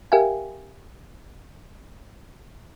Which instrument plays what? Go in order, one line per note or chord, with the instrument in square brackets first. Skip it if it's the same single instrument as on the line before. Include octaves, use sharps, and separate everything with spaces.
[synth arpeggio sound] G4 A#4 E5 F5 G5 G#5